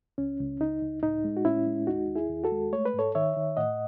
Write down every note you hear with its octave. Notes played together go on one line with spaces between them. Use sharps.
C#2 C#4
C#2
C#2 D#4
C#2
A2 D#4
G#3
F#4
A2 C#4 E4
G#3
D#2 D#4 F#4
D#2
E4 G#4
D#2
F#4 A4
G#3
A3 C#5
B4
G#2 A4 C#5
D#3 C#5 E5
D#3
A2 D#5 F#5